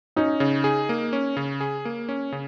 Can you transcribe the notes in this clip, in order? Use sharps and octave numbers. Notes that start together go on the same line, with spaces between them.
C#4 D#4
C#3
G#4
A#3
C#4
C#3
G#4
A#3
C#4
C#3